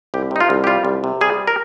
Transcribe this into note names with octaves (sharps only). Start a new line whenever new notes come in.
C2 G4
C3 D#4
F4
C2
G4
G3 F4
C2
C3
G3 G#4
A#4